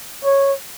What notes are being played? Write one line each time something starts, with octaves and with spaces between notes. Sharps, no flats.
C#5